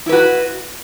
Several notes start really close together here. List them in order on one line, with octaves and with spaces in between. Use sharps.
E4 B4 F#4